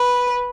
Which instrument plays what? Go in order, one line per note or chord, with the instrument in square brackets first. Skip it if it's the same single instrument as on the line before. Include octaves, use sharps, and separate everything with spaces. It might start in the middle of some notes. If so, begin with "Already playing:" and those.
Already playing: [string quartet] B4